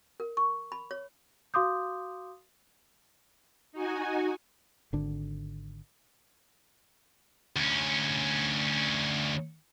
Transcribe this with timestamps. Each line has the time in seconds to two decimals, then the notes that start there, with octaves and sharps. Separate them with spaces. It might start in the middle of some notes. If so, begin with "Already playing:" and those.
0.20 A#4
0.37 C#6
0.72 B5
0.91 C#5
1.54 F#4 F5 C6 D6 D#6 G6
3.72 D#4 F#4 G#5
4.93 G#1 D3
7.56 D2 C#4